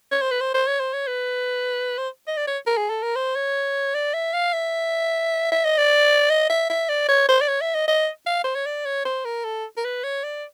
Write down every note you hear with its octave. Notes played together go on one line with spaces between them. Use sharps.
C#5
C5
B4
C5
C5
C#5
C5
C#5
B4
C5
D#5
D5
C#5
A#4
G#4
A4
A#4
C5
C#5
D5
E5
F5
E5
E5
D#5
D5
D#5
E5
E5
D5
C#5
C5
D5
C#5
E5
D#5
D#5
F5
C5
C#5
D5
C#5
C5
A#4
A4
A#4
B4
C#5
D5